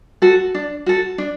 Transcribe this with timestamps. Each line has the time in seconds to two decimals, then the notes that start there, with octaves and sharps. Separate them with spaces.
0.22 F#4 A4
0.55 D4
0.86 F#4 A4
1.18 D4